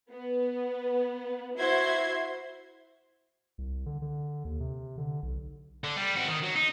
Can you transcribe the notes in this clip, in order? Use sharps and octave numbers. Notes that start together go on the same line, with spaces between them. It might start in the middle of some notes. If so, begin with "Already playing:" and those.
B3
E4 F#4 C5 E5 C6 G#6
C2
D3
D3
D#2
C3
D3
B1
D3
G3
C4 F#4
D#3
F#3
D#4